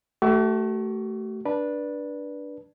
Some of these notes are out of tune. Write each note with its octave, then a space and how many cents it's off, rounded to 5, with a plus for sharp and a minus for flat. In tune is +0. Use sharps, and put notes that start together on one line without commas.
A3 +0 F#4 +45 A#4 +0
D4 +0 B4 -20 D5 +0